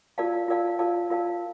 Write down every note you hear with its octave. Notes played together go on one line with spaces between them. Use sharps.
F4 A#4 D5 F5 A5
F4 A#4 D5 F5 A5
F4 A#4 D5 F5 A5
F4 A#4 D5 F5 A5